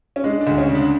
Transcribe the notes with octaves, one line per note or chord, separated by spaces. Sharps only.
C#4
G#3 D4
D4
D2
C#4
C#3
D4